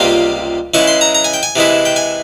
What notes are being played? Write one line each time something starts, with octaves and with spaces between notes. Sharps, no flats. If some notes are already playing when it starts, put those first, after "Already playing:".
Already playing: C#2 C3 G3 A#3 F4
C#3 E3 G#3 E4 C#6
C6
A#5
A#5
G#5
G5
G#5
C3 E3 G#3 E4
G5
G#5